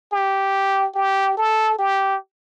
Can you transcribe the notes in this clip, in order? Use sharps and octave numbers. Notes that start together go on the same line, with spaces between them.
G4
G4
A4
G4